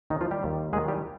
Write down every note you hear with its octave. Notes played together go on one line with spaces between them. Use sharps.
D#2 D#3 D#4
F3 F4
G3 G4
D#2 D#3
D#2 D#3 G#3 G#4
G3 G4